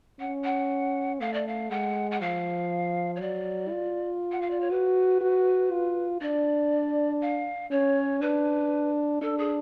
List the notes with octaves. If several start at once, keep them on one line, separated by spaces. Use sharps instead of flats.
C#4 F#5
F#5
A3 F5
D5
F5
G#3 F#5
F#5
F3 F5
C#5
F#3 D5
F4
F#5
F5
D5
C#5
F#4 B4
F#4
F4
D4 D5
F5
C#4 C#5
D4 B4
D4 A4
G#4